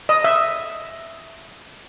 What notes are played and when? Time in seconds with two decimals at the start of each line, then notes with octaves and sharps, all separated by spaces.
0.09 D#5
0.24 E5